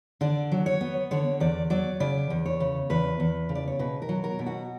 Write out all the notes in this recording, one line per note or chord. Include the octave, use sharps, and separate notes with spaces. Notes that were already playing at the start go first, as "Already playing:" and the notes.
D3 D5
F#3
C#5
B3
D3 C#5
E2 D5
F#3 D5
C#3 D5
E2
C#5
C#3
E2 B4
E2
C#3
D5
C#5
B2 B4
A#4
F#3
A#4
B2
F#4